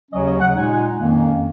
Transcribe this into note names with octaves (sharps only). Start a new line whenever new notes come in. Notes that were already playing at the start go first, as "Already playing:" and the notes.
D#2 C#3 F#3 C#4 D#5
D#5
F#5
A#2 G#3 D#4 G#5
F2 D#3 A#3 C#4